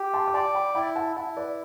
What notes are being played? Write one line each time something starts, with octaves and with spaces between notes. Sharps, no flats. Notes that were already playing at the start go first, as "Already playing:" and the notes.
Already playing: G4
A5 C6
D6
D5 A5 C6
G5 B5
E4 G5 B5
F#5 A5
E4 F#5 A5
B4 D5